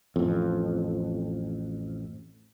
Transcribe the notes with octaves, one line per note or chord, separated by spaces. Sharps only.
A1 F2